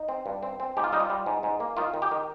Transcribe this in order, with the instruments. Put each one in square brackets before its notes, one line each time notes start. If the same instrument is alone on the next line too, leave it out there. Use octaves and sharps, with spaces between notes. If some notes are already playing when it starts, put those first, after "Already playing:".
Already playing: [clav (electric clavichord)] D#4
C4
G2
C4
C4
G#2 G4
F4
G3 D#4
F4
G3
G#2
G#2
A#3
D#3 F4
D#3
G4
D#3